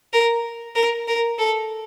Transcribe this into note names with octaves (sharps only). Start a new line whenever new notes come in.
A#4
A#4
A#4
A4